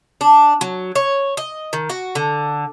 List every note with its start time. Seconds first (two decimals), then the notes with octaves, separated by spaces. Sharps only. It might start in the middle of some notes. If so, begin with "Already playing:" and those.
0.21 D4
0.61 F#3
0.95 C#5
1.37 D#5
1.73 D#3
1.90 F#4
2.15 D3